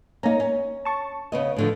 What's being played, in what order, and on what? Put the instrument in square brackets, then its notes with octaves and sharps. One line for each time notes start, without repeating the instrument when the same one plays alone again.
[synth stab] A#3 A#5 [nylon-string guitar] C#4 D#4
[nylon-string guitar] C#4
[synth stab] A5 C#6
[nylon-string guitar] C#3 B3 D#5
A2 D3 F3